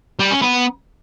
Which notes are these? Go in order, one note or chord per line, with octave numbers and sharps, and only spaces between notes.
G3
C#4
B3